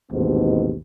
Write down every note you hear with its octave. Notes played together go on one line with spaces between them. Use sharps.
A1 D#2 G#2 B2 C4